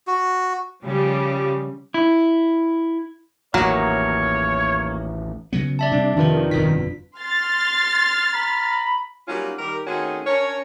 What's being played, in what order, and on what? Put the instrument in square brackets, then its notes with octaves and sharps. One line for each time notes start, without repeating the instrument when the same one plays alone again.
[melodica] F#4
[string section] C#3 F3 G3
[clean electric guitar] E4
[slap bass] A1 D#2 [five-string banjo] F#3 [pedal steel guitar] A#3 [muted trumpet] C#5
[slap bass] C#3 F#3 B3
[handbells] D5 E5 A5
[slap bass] C3 G3 C4 [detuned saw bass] D4
[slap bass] F2 C3 F3 [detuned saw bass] D#3 [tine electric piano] D4 F4 B4
[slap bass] G1 F2 B2 [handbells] B6
[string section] C6 F6 A6
[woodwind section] A#5 B5
[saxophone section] F#3 G3 A#3 C#4 D#4 F4
D#3 G3 G4 A#4
D#3 A3 C4 C#4 F#4 G#4
C#4 D4 A#4 C#5